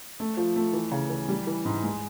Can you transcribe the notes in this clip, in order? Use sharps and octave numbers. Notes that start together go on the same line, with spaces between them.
A3
F3
A3
E3
C#3
E3
G3
E3
G#2
G#3